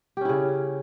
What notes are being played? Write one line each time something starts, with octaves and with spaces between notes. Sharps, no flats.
C#3 C#4 E4 G4